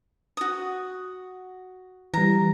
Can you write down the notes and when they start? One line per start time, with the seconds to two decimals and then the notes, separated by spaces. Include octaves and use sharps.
0.37 F#4 D#6
2.14 E3 G3 A#5